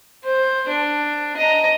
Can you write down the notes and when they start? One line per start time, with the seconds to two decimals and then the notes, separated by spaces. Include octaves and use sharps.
0.24 C5
0.68 D4
1.36 D#5 A#5